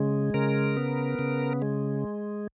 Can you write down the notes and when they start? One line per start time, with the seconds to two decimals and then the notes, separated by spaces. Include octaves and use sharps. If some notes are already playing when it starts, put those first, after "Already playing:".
Already playing: C#3 G#3
0.34 C#3 A#4
0.77 B3
1.19 C#3
1.62 G#3